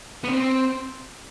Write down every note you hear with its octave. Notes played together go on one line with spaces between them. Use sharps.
B3
C4